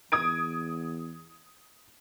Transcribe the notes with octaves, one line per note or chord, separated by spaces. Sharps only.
E2 D#6 G#6 D7